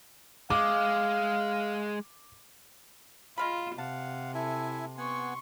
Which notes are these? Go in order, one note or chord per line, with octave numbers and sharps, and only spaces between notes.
G#3 F5 D6
G#3 F4 F5 B5
C3 F5 F#5 A5
E4 A4 E5 G#5
B3 F#5 G#5 C6 C#6